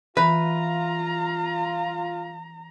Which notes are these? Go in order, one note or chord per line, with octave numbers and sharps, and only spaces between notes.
E3 F4 B4 A#5